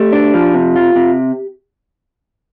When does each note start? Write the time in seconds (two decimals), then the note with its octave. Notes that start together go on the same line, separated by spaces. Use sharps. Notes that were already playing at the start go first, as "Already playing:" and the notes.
Already playing: A3 G4
0.12 D4
0.34 F3
0.54 C3
0.76 F4
0.96 C3